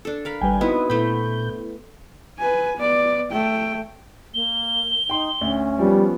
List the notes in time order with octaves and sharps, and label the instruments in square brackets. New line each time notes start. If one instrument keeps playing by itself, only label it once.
[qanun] D4 A4
A#4 F5 B5
[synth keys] G#1 G3 B4 [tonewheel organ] G5 G#5
[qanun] B3 C4 E4 [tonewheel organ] D#4 F#4 D#5 [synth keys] B5
[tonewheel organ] A#2 G6 [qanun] A3 B5 [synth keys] B3 E4
[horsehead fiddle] B4 G#5
B3 D5
A3 G5
[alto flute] A#3 [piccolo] G7
[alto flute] D#4 [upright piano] G5 C6
[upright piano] D2 [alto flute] C#4
[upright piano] F3 B3 [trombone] G3